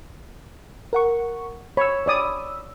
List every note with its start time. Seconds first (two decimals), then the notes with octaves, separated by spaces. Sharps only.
0.93 A#4 F#5 C#6
1.77 C#5 B5 E6
2.06 C#5 D5 D#6